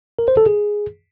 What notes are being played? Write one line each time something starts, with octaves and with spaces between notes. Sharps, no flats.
A#4
C5
A4
G#4